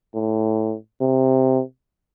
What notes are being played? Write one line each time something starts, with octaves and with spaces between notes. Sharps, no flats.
A2
C3